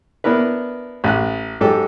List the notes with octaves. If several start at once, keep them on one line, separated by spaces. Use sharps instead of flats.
B3 D4 E4 A#4 B4
A1 F#6
G#2 F#3 G4 A4